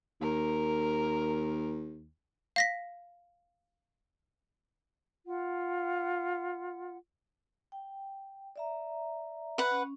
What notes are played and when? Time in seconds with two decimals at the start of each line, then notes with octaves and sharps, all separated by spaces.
0.21 D#2 A#4
2.56 F5 A#6 B6
5.26 F4 F#5
7.72 G5
8.56 D5 E5 A#5
9.58 B4 F#5
9.71 C#4